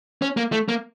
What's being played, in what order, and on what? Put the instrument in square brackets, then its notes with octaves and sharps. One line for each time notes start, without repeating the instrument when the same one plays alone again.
[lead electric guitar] C#4
A#3
A3
A#3